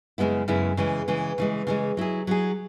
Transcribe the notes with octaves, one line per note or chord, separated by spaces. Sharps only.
F#2 C#3 G#3 B3 E4
F#2 C#3 G#3 B3 E4
C#3 E3 G#3
C#3 E3 G#3
C#3 E3 G#3
C#3 E3 G#3
F#3 E4 G#4
F#3 E4 G#4